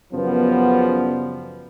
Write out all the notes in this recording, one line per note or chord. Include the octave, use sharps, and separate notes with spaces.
F#2 C#3 F3 G3 B3